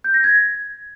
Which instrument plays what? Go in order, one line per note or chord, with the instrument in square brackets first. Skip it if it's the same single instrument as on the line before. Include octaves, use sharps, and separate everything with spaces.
[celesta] G6
A#6
G#6